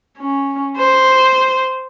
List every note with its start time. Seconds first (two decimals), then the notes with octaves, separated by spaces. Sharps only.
0.18 C#4
0.77 C5